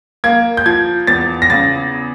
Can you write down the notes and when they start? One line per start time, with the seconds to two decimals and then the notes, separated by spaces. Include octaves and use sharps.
0.24 A#3 G#6
0.57 G6
0.66 F3 G#6
1.07 E2 A6
1.42 A#6
1.50 C#3 A6